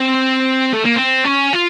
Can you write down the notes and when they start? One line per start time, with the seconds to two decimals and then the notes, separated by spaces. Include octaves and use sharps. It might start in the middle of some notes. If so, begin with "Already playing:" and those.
Already playing: C4
0.73 A3
0.85 A#3
0.95 C4
1.24 C#4
1.53 F4